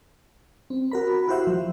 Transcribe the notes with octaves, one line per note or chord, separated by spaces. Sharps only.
C4
F#4 A#4 B5
E4 F#4 G4 C5 E5 F#5
F3